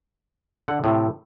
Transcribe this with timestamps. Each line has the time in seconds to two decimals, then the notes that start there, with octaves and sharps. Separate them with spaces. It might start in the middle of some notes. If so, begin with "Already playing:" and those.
0.68 D3 F#5
0.84 A2 C3